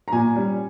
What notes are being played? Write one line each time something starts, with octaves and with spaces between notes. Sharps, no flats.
A#5
A#2 G#5
G3 C#4